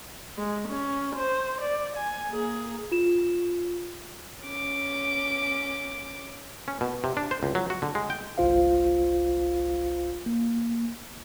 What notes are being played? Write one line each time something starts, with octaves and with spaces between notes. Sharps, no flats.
G#3
C#4
C5
D5
G#5
A#3 G#4
F4 E7
C#4 D6
C#4
B2
C3
D4
C5
C#2
F#3
F#4
D3
G#3
G5
G1 C2 F4 C5 F5
A#3